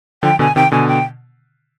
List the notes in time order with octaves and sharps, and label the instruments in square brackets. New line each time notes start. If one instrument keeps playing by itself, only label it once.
[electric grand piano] D3 F3 [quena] G5
[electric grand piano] B2 D3 [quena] G#5
[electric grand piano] C3 D#3 [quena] G5
[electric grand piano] B2 D3 [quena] G#5
[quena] G5